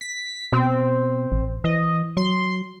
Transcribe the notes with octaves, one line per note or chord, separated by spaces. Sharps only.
B6
B2 C4
A1
E3 D#5
F#3 C6